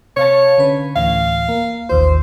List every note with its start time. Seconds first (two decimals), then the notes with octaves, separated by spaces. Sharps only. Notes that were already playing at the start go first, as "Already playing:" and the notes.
0.17 C3 C#5 F5 A5
0.58 D3 C#4 B4
0.96 D2 A2 E3 F5
1.49 A#3
1.89 A1 D#2 F4 C5